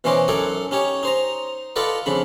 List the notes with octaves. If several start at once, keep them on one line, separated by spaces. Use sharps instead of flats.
B2 E3 C#4 C5 D#5 D6
F#2 D#4 A4 F#5 G#5 D6
C#4 D#4 G4 C#5
D#4 C5 A#5
F4 A4 B4 D5 D#5 F#5
F2 C#3 D4 B5